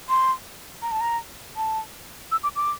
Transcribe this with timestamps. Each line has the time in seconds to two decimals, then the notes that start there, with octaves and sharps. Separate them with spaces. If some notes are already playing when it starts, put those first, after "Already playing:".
0.09 C6
0.82 A#5
0.92 A5
1.01 A#5
1.56 A5
2.32 E6
2.43 D6
2.56 D6